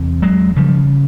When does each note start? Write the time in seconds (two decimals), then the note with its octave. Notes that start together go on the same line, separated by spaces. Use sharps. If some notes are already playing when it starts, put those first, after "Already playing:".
Already playing: E2 C3
0.22 F#3 G#3
0.56 C#3 F3 G3